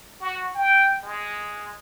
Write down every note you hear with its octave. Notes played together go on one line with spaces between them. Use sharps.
F#4
G5
G#3